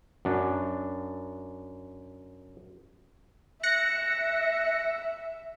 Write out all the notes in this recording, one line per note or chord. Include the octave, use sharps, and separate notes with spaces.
F#2 D4
E5 F#6 A#6 C#7